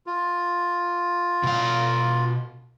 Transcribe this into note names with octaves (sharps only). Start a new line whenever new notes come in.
F4
B2 F5